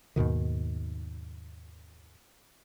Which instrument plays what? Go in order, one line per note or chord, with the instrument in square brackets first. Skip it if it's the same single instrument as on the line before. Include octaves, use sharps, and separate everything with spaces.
[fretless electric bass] D#2 G#2 B2 D#3